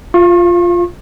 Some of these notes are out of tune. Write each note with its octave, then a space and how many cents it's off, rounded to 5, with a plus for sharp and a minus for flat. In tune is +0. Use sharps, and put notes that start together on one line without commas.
F4 +0 F5 -30 C#6 -45